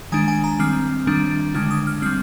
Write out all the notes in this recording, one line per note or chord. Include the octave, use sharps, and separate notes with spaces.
D#3 G#3 D4 G#5
G#5
A#5
D#3 G3 C4 F6
D#3 G3 D4
D3 G#3 D4 F6
D#6
F6
G3 C4 F6